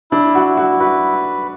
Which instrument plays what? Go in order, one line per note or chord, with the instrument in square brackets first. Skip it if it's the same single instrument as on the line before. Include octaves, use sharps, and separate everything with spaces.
[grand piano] D4 [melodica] E4
[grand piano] F#4
[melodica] E4
[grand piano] F#4
[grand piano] F#4 [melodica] B4